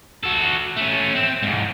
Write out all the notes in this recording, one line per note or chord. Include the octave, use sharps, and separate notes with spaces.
F#4 A4
A3 C#4
C4
E2 G#2